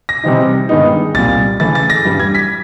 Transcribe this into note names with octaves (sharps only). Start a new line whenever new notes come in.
A#6
C3 E3 G3 C4 D#4
G2 D#3 G#3 B3 D#4
C2 A#2 G3 A6
C#3 E3 A3 A6
A6
A#6
G2 E3 G3
G#6
B6